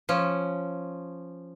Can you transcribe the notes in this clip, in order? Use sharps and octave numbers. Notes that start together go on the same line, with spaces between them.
F3 C#4